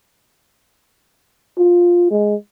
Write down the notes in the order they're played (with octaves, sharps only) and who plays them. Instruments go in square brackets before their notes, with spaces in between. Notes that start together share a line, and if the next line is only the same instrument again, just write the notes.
[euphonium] F4
G#3